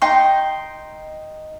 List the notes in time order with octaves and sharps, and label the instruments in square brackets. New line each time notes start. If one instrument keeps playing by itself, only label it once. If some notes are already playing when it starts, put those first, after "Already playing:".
[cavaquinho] D#4 G5 C6